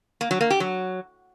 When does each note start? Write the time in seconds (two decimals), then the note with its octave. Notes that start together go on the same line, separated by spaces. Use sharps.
0.21 A#3
0.31 F#3
0.41 A#3
0.50 G4
0.60 F#3